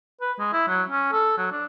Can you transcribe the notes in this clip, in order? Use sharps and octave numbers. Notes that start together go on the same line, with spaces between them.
B4
G#3
E4
F#3
C#4
A4
F#3
D4